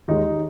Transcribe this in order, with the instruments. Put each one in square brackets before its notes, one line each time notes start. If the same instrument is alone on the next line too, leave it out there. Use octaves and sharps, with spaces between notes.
[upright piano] D#2 D#3 G#3 D#4